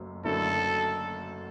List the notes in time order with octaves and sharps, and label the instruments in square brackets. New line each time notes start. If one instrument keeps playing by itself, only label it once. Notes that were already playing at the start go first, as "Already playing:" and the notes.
Already playing: [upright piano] F#1 F#2 A3
[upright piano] F#1 F#2 D3 A3 E4 [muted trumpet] A4